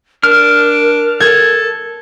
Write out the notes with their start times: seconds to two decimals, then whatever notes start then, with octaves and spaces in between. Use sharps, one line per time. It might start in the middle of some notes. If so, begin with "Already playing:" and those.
0.24 D4 A#4 F6
1.20 A4 G#6